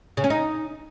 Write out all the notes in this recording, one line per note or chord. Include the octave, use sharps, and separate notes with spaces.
C#3
C#4
D#4